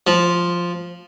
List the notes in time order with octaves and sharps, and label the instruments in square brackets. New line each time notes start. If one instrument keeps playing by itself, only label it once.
[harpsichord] F3